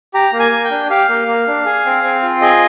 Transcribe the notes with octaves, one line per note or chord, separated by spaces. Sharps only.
G4 A#5
A#3
G#5
A#3
G5
D4
G4 F5
A#3
A#3
D4
G#4
C4
C4
F4
G#4 D#5